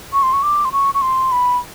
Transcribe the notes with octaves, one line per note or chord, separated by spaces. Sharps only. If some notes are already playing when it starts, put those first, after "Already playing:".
C#6
C6
C#6
D6
C6
C#6
C#6
C6
B5